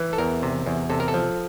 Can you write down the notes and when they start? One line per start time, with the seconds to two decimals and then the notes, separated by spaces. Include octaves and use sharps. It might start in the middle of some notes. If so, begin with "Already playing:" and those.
Already playing: E3
0.13 A4
0.18 E2 A#4
0.42 C3
0.66 E2
0.90 C3 A4
1.00 A#4
1.08 A4
1.14 F3